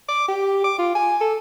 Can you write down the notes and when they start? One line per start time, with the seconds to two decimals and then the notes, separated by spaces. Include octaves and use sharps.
0.08 D6
0.28 G4
0.64 D6
0.78 F4
0.95 G#5
1.21 A4